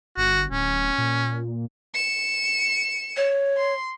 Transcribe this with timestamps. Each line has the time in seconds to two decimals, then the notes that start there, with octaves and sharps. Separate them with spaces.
0.17 G1 F#4
0.51 D1 C#4
0.98 A#2
1.94 C#7 E7
3.17 C#5
3.57 C6